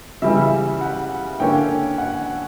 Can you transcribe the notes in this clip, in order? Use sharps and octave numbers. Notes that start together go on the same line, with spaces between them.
C#3 E3 G3 E5
F#5
D3 A#3 C#4 G5
F#5